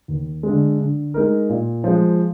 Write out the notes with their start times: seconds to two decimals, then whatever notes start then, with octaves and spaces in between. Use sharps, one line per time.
0.08 D#2
0.43 G#3
0.48 D3
0.79 D3
1.14 G#3 D#4 A#4
1.49 A#2
1.84 F3 G#3